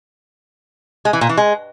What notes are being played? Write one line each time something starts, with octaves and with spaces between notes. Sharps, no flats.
G#3
E3
A#2
E3
G#3